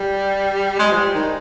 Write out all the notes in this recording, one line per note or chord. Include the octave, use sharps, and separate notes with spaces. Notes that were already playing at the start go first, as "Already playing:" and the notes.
Already playing: G3
G#3
F3
G3
D#3